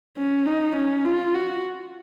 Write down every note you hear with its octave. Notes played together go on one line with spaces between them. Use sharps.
C#4
D#4
C#4
F4
F#4